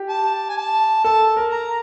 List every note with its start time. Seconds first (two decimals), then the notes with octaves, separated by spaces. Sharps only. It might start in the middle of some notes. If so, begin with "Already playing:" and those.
Already playing: G4
0.09 A5
0.50 G#5
0.57 A5
1.04 A4 A5
1.37 A#4
1.51 A#5